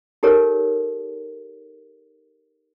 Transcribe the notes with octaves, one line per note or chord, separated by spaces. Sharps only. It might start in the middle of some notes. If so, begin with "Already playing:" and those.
D#4 G4 A4 A#4 C#5